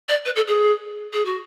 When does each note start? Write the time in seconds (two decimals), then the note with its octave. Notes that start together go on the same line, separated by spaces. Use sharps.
0.09 D5
0.25 B4
0.35 A4
0.47 G#4
1.13 G#4
1.25 F#4